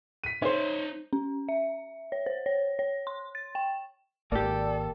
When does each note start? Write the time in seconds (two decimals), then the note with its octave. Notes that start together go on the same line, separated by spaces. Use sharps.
0.24 B6 D#7
0.42 D#4 C5 C#5 E5
1.13 C#4
1.49 E5
2.12 C#5
2.26 C5
2.46 C#5
2.79 C#5
3.07 C6
3.35 A6
3.55 G5
4.32 G#1 A#3 G4 A4 D5